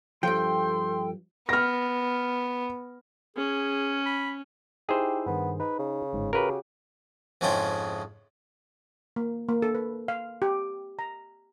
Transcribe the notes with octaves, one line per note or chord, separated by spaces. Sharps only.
G2 F3 A4 G5 C6
B3 F6 A#6
C#4 G#4
B5
D#4 E4 G4 G#4 C5 E6
G2 D#3 B3
D#4 B4
C#3
G1 G#2
C#3 F#4 G4 A#4 B4
F2 G#2 C#3 F3 E4 G5
A#3
A#3
A4
B4
F5
G4
A#5